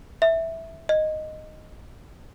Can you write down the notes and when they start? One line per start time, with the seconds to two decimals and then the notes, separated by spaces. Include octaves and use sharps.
0.22 E5
0.89 D#5